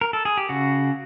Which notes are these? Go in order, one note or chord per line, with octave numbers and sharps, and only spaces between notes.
A#4
A4
G#4
G4
C#3 F#4